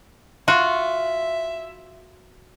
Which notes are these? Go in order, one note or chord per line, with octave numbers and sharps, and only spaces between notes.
F4 F#4 E5